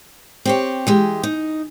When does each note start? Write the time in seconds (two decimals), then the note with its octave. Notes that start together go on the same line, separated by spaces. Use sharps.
0.45 C4 G4 C#5
0.87 E3 G#3 G4
1.23 D#4